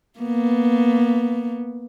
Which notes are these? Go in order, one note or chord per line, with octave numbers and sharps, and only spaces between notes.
A#3 B3